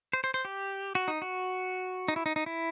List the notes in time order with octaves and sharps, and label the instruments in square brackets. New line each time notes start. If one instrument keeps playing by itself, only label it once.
[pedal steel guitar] C5
C5
C5
G4
F#4
D#4
F#4
D#4
E4
D#4
D#4
E4